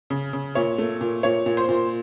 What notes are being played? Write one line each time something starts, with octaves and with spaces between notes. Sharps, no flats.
C#3
C#3
A#2 C#5
A3
A#2
A#2 C#5
A#2
C5
A#2